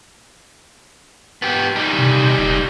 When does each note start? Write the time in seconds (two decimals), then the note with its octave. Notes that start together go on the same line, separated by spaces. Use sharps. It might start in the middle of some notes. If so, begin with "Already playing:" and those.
1.42 B3 G4
1.76 G3 D#4
1.98 C3
2.38 E1